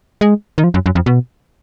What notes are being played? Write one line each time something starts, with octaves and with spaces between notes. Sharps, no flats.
G#3
D#3
F3
F#2
F#2
F2
B2